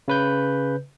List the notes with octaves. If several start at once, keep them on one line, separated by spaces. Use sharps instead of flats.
C#3 B4 G6